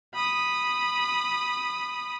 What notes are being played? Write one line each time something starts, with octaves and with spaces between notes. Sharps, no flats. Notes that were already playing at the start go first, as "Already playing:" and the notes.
B5 D#6